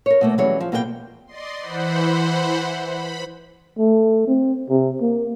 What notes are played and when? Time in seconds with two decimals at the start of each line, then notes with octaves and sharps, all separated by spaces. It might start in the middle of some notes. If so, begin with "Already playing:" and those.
0.06 A#4 C#5
0.21 B2 A3 A#3
0.38 E3 F#3 G3 C#4 G#4 C#5
0.60 F3
0.72 B2 A#3 G#4 A#4 G5
1.27 D5 D#5 C6
1.59 E3 C5 F#5 B5
2.92 B5
3.79 A3
4.27 C4
4.69 C3
5.01 A#3